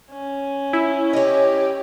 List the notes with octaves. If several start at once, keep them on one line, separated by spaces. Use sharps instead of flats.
C#4
E4
G4 C#5 D#5